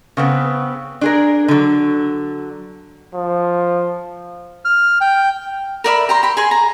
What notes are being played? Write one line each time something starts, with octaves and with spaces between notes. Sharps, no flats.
C#3 B3 C4
D4 G#4 A#4
D3 F#3
F3
F6
G5
A#4 D5 E5 B5
G4 A#5 C6
G4 B5
G#4 G#5 C6
A#5